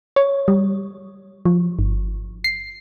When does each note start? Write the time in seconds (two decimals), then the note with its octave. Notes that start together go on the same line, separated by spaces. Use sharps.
0.16 C#5
0.48 G3
1.45 F3
1.79 G1
2.44 C7